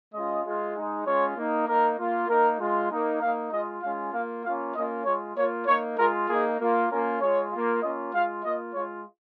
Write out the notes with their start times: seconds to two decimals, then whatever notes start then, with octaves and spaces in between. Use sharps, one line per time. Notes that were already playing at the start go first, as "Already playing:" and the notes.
0.14 G#3 C#4 F4 D#5
0.44 G#3 F4
0.75 G#3 D#4
1.06 G#3 C#4 F4 C#5
1.36 A#3 D#4
1.67 A#3 D#4 A#4
1.98 A#3 F4
2.29 A#3 D#4 A#4
2.60 G#3 F4
2.90 A#3 D#4
3.21 A#3 D#4 F5
3.52 G#3 F4 D#5
3.82 G#3 C#4 F4 F5
4.13 A#3 F4 F5
4.44 A#3 C#4 F4 F5
4.75 A#3 C#4 F4 D#5
5.05 G#3 F4 C#5
5.36 A#3 F4 C#5
5.67 A#3 D#4 C#5
5.97 G#3 F4 A#4
6.28 A#3 D#4 G#4
6.59 A#3 F4
6.90 A#3 C#4 F4 A#4
7.21 G#3 F4 C#5
7.51 A#3 F4
7.81 A#3 C#4 F4 D#5
8.13 G#3 F4 F5
8.44 A#3 F4 D#5
8.74 G#3 F4 C#5